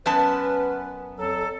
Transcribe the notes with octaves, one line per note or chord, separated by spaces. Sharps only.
F#2 B3 C#4 B4 A5
F2 F#3 A4